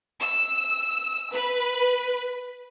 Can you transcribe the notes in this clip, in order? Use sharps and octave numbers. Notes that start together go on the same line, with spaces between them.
E6
B4